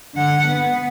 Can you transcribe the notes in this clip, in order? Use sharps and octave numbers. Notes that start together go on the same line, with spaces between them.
D3 F#5
B3